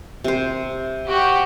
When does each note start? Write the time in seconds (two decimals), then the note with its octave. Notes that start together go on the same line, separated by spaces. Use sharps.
0.24 C3 C5
1.07 F#4 G4